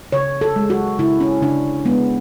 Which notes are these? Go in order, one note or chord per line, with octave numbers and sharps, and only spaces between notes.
C#3 C#5
A4
G#3
F#4
C#3 E4
C#4
C#3 D4
G#3 B3